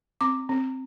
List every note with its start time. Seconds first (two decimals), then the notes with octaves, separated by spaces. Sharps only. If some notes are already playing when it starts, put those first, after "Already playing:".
0.21 C4 D6
0.49 C4